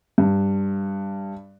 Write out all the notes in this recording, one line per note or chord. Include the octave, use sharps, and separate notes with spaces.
G2